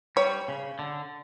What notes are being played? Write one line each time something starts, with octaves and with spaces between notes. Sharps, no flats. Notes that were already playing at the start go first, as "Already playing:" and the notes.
G3 C#5
C#3
D3